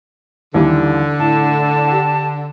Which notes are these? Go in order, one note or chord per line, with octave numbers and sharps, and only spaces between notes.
D#2 D3 E3 G3
A2 A5
G4 F#5